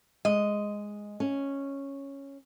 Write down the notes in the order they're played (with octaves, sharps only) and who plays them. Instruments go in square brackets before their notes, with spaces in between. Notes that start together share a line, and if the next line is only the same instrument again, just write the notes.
[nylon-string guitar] G#3 [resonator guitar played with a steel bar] D#5
[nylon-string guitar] C#4